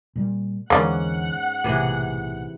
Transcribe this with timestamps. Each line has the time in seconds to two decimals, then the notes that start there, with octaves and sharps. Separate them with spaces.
0.16 A#2 G3
0.70 E2 G#2 D3 E3 A#3 C#4 D5 F#5
1.64 B1 A2 C3 E3 G#4